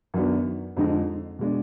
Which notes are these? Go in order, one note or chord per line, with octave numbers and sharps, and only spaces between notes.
F#2 D#3 F#3 B3 D4
F2 D3 G#3 D#4
B2 G#3 D4